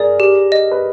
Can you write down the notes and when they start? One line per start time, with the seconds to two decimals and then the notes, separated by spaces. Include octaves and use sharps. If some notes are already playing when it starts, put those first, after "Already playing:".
Already playing: G#4 A#4 D5
0.20 G4
0.52 D#5
0.71 B4